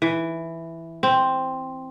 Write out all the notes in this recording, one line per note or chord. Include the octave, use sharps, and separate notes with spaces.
E3
C4